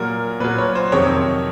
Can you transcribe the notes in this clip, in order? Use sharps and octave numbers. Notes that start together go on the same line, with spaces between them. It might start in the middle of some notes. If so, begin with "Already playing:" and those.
Already playing: A#2 F#3 A#4
A#2 F#3 B4
C#5
C5
F2 C3 D#3 F#3 C#5